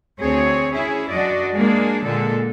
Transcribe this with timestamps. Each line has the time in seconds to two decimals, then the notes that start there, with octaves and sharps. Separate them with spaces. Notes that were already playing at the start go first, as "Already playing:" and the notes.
0.19 D2 C4 G#4 C#5
0.71 C#4 E4 G#4
1.09 F#2 D4 F#4 D5 D#5
1.57 G#3 A#3 D4 G#4
2.05 A#2 D3 G#3 A4